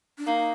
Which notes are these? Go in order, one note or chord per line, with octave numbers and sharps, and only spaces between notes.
D4
A#3 D#4